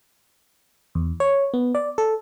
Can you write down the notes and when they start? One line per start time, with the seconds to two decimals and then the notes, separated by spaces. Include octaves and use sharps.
0.95 E2
1.20 C#5
1.54 B3
1.75 D5
1.98 A4